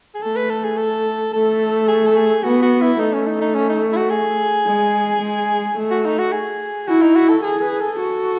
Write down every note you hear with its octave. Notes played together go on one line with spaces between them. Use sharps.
G#4
A3 A4
B4
A4
G#4
A4
A3 A4
G#4
A4
G#4
B3 F#4
F#4
E4
A3 D#4
C#4
D#4
D#4
C#4
D#4
E4
F#4
G#4
G#3
G#3
A3
F#4
D#4
F#4
G#4
E4 F#4
D#4
F#4
A4
G#4 A4
B4
A4
F#4